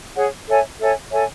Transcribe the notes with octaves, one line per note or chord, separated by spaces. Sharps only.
G#4 C#5 F#5
A4 C#5 E5 G#5
A4 C#5 E5 G#5
A4 C#5 E5 G#5